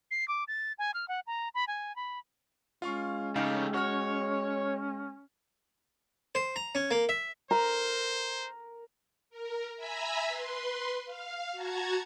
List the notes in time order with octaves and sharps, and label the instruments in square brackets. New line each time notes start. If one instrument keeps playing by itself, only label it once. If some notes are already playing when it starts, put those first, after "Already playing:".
[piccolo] C7
D6
A6
G#5
F6
F#5
A#5
B5
G#5
B5
[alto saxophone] G#3 [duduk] C#4 [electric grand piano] F4 F5 C#6
[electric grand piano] C#3 D#4 F5 [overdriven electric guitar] A3 G4
[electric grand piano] F#4 F6 [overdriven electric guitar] C#5
[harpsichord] C5
A#5
C#4
A#3
E5
[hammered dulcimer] A#4 [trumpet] C5 [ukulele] A#5
[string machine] A#4
E5 G#5 A#5 B5 E6
B4 C6
F5
F#4 A5 A#5 G#6